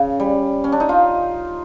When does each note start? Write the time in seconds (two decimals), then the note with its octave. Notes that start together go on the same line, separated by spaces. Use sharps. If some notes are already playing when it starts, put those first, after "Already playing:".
Already playing: C#3
0.20 G3
0.64 C#4
0.72 D4
0.80 D#4
0.89 F4